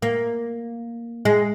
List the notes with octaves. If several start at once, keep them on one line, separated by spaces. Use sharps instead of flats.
A#3
G#3